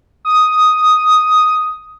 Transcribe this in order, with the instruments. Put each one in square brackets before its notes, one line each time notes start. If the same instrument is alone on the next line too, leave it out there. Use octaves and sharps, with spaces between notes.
[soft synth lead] D#6